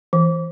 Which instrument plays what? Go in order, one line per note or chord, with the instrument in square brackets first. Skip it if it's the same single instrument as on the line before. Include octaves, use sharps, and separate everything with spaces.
[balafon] E3